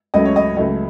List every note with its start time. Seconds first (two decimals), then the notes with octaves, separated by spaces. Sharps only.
0.14 C#2 C#3 F#3 A3 D#5
0.25 C#5
0.36 D#5
0.57 C#2 C#3 F#3 A3 D#5